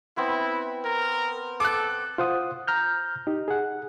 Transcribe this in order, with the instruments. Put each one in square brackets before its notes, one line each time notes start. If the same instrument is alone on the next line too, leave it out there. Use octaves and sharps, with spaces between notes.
[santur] B3 C4 [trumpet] E4
[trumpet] A#4
[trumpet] A4 [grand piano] D6 F#6
[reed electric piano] F4 C5 F#5 D#6
A#5 F6 G6
D#4 G4
G#4 F#5